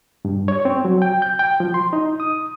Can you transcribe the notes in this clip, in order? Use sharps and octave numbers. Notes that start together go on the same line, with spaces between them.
G2
C#5
C4
F#3
G5
G6
G5
F3
C6
D#4
D#6